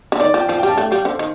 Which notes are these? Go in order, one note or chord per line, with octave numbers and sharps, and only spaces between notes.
D3
D#3 D5
F3
G5
F3 F5
G5
G3 A5
A3 G5
G3 F5
D3 C5
D#3